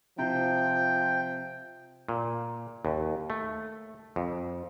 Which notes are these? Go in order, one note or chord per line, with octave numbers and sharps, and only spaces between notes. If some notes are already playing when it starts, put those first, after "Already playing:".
C3 F3 G5
A#2
D#2
A3
F2